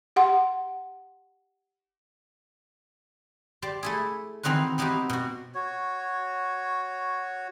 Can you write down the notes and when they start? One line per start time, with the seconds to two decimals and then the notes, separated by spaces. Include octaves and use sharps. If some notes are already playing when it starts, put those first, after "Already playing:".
0.16 G4 F#5 C6
3.62 G4 C5 D5
3.83 A3 E4 G#4
4.43 D#3 E3 C4 D#4 F#4 B4
4.78 B3 C4 D#4 E4 F#4 G4
5.10 B2 F#4
5.55 F#4 C#5